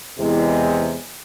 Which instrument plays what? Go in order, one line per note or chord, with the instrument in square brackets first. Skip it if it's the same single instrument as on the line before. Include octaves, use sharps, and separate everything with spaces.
[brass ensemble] E2 C3 G#3